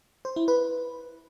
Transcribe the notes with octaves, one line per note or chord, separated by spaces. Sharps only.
C5
E4
B4